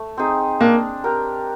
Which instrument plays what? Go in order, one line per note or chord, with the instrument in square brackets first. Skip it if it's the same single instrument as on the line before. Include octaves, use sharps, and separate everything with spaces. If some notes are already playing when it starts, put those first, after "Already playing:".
Already playing: [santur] A3
C4 D#4 G#4
[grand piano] A#3 [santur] D4
[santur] G4 A#4